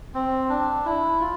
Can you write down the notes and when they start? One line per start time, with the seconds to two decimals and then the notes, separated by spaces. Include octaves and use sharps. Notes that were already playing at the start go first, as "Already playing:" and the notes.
0.14 C4
0.49 D4
0.86 E4
1.21 F4